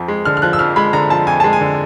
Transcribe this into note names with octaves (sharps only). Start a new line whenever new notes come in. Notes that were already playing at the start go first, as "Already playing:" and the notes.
Already playing: F2 F3
G#3
D3 F6
F6
F3 F#6
E6
F2 F6
G#3 B5
D3 A#5
F3 A5
F2 G#5
G#3 A5
G#5
D3